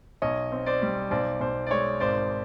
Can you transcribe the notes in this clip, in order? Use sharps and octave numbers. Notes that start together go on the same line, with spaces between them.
B1 C#5 D#5
C4
C5 D5
G3
B1 C5 D5
B1 C5
D5
G#3 C#5
G#1 C5 D5